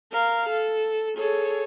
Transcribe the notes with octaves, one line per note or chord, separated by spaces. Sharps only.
A#4 F5
A4
G#4 A4 C#5